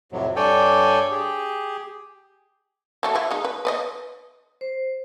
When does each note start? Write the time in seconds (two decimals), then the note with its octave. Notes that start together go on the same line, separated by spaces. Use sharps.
0.12 F2 A2 C3 F#3
0.36 G2 A4 C#5 D5 G5 G#5
1.12 G4 G#4
3.03 F#3 A3 A4
3.15 F#3 E4 F4
3.31 G#3 D#4
3.45 B4
3.65 B4 D5 D#5
4.61 C5